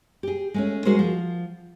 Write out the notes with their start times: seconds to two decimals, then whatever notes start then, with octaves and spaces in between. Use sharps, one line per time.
0.23 G4 G#4
0.54 G#3 A3 C#4
0.85 G#3 F#4 G#4 A#4 C5
0.99 F3